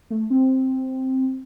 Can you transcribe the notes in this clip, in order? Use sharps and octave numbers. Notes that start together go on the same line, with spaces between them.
A3
C4